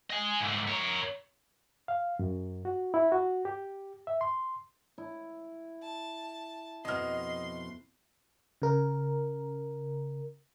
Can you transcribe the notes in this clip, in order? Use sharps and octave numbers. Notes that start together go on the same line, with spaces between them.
D#5 G#5
G#2 A3
A#4 C#5
F5
F#2
F#4
E4
F#4
G4
E5
C6
E4
A5
F2 B2 D#5 C6 F6
C#3 A#4